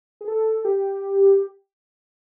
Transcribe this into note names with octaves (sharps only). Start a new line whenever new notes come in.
G#4
A4
G4